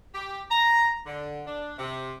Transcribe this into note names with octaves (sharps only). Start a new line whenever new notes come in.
G4
A#5
D3
D4
C3